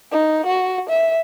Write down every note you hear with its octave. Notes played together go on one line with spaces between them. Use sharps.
D#4
F#4
E5